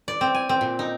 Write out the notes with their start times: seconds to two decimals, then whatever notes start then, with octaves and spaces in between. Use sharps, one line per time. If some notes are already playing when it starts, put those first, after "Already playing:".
0.08 D5
0.21 C4
0.35 G#5
0.49 C4
0.61 A#2
0.79 D#4